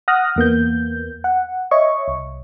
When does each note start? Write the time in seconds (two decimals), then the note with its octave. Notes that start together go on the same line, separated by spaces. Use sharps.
0.08 F#5 D#6 F6 F#6 A#6
0.36 E2 A#3 B3 G6
1.24 F#5
1.71 C#5 D#5 E5 C#6
2.08 C2